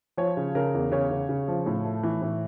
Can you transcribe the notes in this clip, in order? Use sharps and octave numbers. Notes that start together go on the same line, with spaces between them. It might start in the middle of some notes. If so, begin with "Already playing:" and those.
F3 C#5
C#3
C#3 A#4
E2
C#3 C#5
C#3
C#3
F3
A2
A3
E3
A2